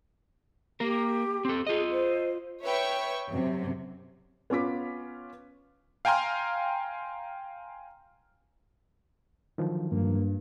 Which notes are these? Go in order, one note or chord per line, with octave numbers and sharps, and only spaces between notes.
A#3 G4 A#4
C4 A4
F4 G#4 D#5
C5
B4 C#5 E5 G5 C#6
F#2 C3
B3 C#4 F4 D6 B6
F5 G5 G#5 A#5 C6 F6
D3 D#3 F3 F#3
G2 A#3